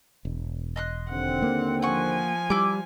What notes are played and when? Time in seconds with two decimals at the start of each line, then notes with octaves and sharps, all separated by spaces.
0.25 E1
0.76 D#5 C6 F#6
1.10 D#2 D3 C4 F#5
1.42 A#3
1.82 F3 F#5 G#5 C#6
2.50 G3 E4 D6